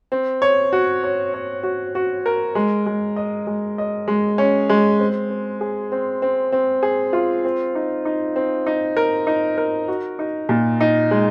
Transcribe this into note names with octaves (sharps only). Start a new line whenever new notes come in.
C4
C#5
F#4
C#5
C#5
F#4
F#4
A#4
G#3
G#3
D#5
G#3
D#5
G#3
C#4
G#3
C4
C4
G#4
C4
C4
C4
G#4
F4
C4
D#4
D#4
C4
D#4
A#4
D#4
A#4
F#4
D#4
A#2
D#4
G#3